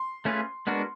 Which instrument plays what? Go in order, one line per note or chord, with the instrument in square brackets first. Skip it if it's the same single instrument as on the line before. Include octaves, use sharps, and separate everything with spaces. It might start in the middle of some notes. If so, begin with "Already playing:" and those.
Already playing: [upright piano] C6
[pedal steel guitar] A3 C#4 F4 G#4 B4
G#3 B3 D4 F#4 A#4